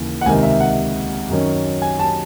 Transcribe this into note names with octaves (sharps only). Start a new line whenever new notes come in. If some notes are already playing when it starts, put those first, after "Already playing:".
Already playing: D#2 C#3 E3
F#5
C#2 C3 D#3 G#5
E5
F#5
F#2 D#3 F#3 C#4
G#5
A5